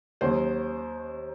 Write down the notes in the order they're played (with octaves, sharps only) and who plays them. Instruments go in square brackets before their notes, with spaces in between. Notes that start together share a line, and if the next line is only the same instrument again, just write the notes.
[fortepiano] D#2 D#3 F#3 C5